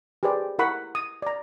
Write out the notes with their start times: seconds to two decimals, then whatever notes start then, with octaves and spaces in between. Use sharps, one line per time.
0.23 G4 G#4 B4 C5 D5
0.59 E4 A#4 F#5 B5 C#6
0.95 D#6
1.22 D5 A#5